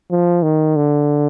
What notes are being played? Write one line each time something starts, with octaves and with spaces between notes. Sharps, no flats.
F3
D#3
D3